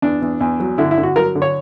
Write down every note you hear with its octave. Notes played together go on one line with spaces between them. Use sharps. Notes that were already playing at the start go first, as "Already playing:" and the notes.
E2 D4
E2
E2
F#3
D3 E4
E4
D3
F#4
F#3 A#4
D3
C#5